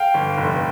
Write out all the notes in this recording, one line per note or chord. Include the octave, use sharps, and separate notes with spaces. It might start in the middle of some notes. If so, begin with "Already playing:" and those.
Already playing: F5 G5
G1
F1